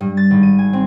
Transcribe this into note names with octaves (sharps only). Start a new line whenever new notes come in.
G2
A6
G#1
D#7
G#5
C4